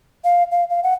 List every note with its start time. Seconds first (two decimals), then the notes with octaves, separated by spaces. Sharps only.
0.24 F5
0.52 F5
0.70 F5
0.83 F#5